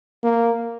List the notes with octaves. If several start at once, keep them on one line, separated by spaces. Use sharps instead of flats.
A#3